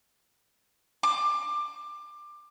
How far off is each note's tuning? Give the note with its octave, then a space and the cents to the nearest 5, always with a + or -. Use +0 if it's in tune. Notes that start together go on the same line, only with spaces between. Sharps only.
D6 +20